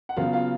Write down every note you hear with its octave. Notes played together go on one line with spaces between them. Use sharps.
F#5
C#3 F#3 B3 F4 F5
F4 F5